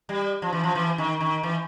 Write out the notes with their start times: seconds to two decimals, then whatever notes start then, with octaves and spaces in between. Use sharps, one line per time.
0.09 G3
0.42 F3
0.53 E3
0.64 F3
0.75 E3
0.98 D#3
1.21 D#3
1.43 E3